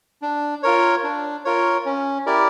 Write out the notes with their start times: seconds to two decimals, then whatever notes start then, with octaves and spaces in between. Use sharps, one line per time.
0.22 D4
0.63 F4 A#4 C#5
1.04 D4
1.45 F4 A#4 C#5
1.86 C#4
2.26 E4 G4 A#4 D5